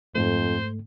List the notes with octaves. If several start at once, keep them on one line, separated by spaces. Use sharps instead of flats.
F2 G#2 A3 C5